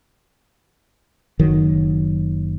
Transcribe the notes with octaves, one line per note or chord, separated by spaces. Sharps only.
F#1 D#3 F#3